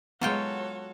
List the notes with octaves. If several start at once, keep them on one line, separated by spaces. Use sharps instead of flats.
F#3 G#3 B3 F4 F#4 A4 C#5 G5